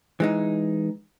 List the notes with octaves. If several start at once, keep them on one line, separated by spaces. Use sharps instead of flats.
E3 G#3 D#4